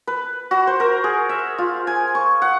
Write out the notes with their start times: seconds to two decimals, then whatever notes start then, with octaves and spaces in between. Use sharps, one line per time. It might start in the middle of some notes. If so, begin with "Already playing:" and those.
0.07 B4
0.51 F#4
0.67 C5
0.80 A#4
1.04 G#4
1.29 E5
1.58 F4
1.87 G#5
2.15 C#6
2.42 F#5